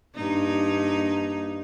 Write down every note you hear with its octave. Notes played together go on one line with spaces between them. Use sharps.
G2 A#3 D#4